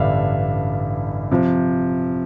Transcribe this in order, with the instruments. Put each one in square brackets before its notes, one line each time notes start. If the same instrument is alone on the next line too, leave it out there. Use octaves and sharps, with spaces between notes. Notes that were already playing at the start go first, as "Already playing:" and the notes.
Already playing: [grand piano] A1 G2 D3 G3 E5 F5
C3 F3